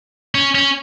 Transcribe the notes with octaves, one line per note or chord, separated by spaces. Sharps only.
C#4
C#4